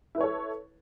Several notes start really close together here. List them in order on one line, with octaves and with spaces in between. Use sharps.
E4 B4 C#5 A4